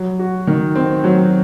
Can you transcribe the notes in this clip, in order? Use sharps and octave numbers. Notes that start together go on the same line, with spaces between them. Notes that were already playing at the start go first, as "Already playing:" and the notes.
Already playing: F#3
F#4
D#3
C4
F#3